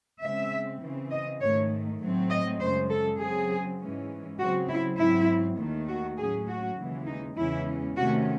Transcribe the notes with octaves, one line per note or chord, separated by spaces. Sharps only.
C#3 G#3 C4 E5
C#3 E3 C4
D#5
G#2 D#3 A3 C#5
A2 F#3 A3 C4
D#5
F#2 C#3 G#3 C5
A4
C#3 F#3 C4 G#4
G#2 E3 G#3 C#4
C#3 F#3 C4 F#4
E4
G#2 F#3 C4 E4
D#2 D#3 A3
F#4
A2 F#3 C#4 G#4
F#4
D#2 C#3 E3 G#3
D#4
E2 C#3 E3 G#3 C#4 E4
C3 D#3 A3 C#4 F#4